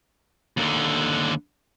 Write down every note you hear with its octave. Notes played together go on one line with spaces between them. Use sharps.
D#2 D3